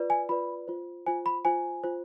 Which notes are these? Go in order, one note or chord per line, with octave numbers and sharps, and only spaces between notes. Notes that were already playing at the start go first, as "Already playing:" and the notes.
Already playing: F4 B4 D5
G#5
F4 B4 D5 B5
F4 C5
F4 C5 G#5
B5
F4 C5 G#5
F4 C5